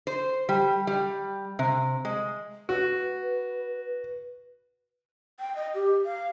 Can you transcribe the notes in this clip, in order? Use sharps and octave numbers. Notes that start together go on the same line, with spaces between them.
C5
G3
G3
C3
G#3
F#4 B4
G5
D#5
G4
F5